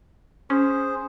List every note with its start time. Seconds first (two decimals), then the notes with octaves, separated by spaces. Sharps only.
0.50 C#4 G#4 C5